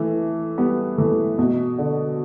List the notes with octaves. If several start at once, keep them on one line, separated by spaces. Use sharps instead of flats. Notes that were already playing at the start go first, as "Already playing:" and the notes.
Already playing: E3 A3
G3 B3
E3 A3
B2
D3